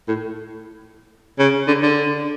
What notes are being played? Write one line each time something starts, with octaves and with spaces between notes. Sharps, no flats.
A2
C#3
D3
D3